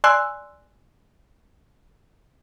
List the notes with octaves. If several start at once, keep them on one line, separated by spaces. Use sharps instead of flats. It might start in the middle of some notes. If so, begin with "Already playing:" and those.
D5 G#5 C6 E6 F#6